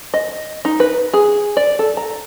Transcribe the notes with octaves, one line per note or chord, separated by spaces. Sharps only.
D#5
D#4
B4
G#4
D5
A4
A#5